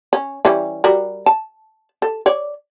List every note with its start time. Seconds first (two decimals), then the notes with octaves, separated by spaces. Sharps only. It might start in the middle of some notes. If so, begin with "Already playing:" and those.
0.13 C#4
0.45 E3 G3 C#4
0.84 G3 F#4 A#4
1.26 A5
2.02 A4
2.26 C#5 D5